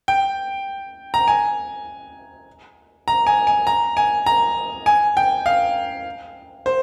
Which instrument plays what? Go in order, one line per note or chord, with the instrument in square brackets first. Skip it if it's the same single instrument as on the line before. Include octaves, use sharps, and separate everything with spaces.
[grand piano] G5
A#5
G#5
A#5
G#5
G#5
A#5
G#5
A#5
G#5
G5
F5
C5